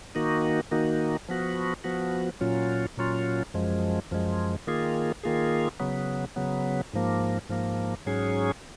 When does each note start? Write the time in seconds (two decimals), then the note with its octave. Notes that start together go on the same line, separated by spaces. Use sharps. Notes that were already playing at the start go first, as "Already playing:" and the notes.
0.15 D#3 A#3 D#4 F#4
0.71 D#3 A#3 D#4 F#4
1.29 F3 B3 F#4
1.84 F3 B3 F#4
2.41 A#2 F#3 C#4 F4
2.97 A#2 F#3 C#4 F4
3.54 F#2 F3 G#3
4.11 F#2 F3 G#3
4.67 D#3 A#3 F4 G#4
5.23 D#3 A#3 F4 G#4
5.80 C#3 F#3 B3
6.36 C#3 F#3 B3
6.94 G#2 F3 A#3
7.49 G#2 F3 A#3
8.06 G#2 F#3 C#4 G#4